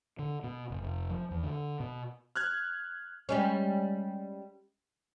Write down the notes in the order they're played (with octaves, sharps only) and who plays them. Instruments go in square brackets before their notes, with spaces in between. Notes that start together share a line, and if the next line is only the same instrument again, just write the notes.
[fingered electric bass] D3
B2
F#1
F1
F3
E2
D3
B2
[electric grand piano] F6 F#6 G#6
[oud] G3 G#3 C#4